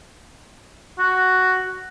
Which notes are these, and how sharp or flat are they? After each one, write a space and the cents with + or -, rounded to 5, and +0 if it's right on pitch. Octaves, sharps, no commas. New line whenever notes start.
F#4 +5